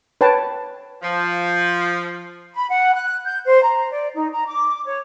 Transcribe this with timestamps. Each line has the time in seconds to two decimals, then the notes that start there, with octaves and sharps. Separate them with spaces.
0.21 B4 C#5 G5 A5
1.02 F3
2.54 B5
2.69 F#5
2.94 F#6
3.26 G6
3.45 C5
3.62 A#5
3.91 D5
4.15 D#4
4.32 A#5
4.48 D6
4.85 C#5